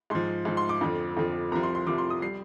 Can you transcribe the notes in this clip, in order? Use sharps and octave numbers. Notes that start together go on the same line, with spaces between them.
G#2 F3 C6
G#2 F3
C6
D6
F2 D3 F3
F2 D3 F3
C2 C3 F3 A#5
C6
C6
C2 C3 F3 D6
C6
D#6
G3 C7